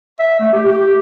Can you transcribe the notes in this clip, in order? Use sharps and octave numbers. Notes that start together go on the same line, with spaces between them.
E5
A3
G4
G4